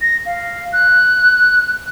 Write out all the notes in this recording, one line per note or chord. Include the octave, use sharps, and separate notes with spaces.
A#6
F5
F#6